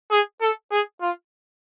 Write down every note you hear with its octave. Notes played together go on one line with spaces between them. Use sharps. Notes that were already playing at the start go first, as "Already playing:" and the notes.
G#4
A4
G#4
F4